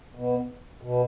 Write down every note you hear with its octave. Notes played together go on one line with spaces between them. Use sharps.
B2
B2